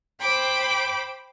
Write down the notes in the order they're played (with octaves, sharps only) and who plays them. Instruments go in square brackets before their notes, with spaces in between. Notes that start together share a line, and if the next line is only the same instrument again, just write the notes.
[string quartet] C5 G5 B5 D6